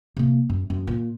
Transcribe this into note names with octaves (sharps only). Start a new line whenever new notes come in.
C3 A#3
F#2
F#2
A#2